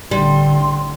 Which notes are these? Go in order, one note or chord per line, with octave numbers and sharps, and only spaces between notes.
A1 D3 G3 C6